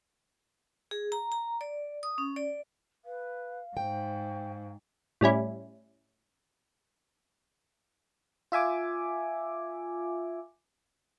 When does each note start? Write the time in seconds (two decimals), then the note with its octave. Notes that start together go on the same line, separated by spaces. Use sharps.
0.91 G#4
1.12 A#5
1.32 A#5
1.61 D5
2.03 D#6
2.18 C#4
2.36 D5
3.05 B4 F5
3.77 G#2 C5 G5
5.21 A2 G3 C#4 E4
8.52 F4 E5 G#5 D6